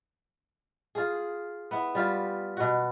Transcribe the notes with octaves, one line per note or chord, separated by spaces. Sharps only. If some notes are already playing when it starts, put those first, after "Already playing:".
F4 G#4
B3 E4
G3 F4 G4
B2 F#4